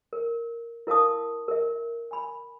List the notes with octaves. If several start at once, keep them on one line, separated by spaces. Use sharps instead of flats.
A#4
E4 A#4 F5 A5 D#6
A#4 E5
G#5 B5